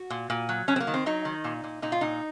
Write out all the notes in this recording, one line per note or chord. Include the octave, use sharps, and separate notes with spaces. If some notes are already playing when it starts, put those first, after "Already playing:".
Already playing: F#4
A#2
A#2
F#3
F#3 C#4
C4
A#3
D#3
C4
F#3 D#4
D#3
A#2
A#2
A#2 D#4
F4
A#2 D#4